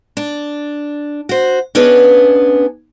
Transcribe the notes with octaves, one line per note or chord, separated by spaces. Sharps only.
D4
F#4 C5
B3 C#4 D4 G#4 B4 D#5